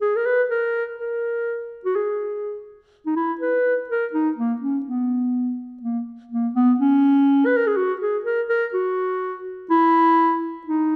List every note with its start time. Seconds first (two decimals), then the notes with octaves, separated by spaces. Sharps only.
0.01 G#4
0.16 A#4
0.26 B4
0.50 A#4
0.99 A#4
1.85 F#4
1.95 G#4
3.06 D#4
3.16 E4
3.41 B4
3.90 A#4
4.13 D#4
4.37 A#3
4.62 C#4
4.86 B3
5.83 A#3
6.31 A#3
6.55 B3
6.80 C#4
7.46 B4
7.57 A#4
7.67 G#4
7.77 F#4
8.01 G#4
8.25 A#4
8.49 A#4
8.73 F#4
9.71 E4
10.67 D#4